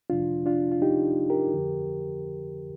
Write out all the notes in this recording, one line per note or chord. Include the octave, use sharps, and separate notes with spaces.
F2 C3 F3 D4 F4
D4 F4
F4
D#4 G4
G4 A#4
F2 D3 F3